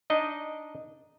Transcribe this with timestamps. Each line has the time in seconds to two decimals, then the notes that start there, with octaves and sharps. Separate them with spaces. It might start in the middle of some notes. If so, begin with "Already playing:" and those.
0.10 D4 D#4 D#5